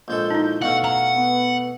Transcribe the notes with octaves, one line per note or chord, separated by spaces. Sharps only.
A#1 G#3 A4 G6
D#4 E4
B2 A3 F5 F#5
F#5 A#5
B3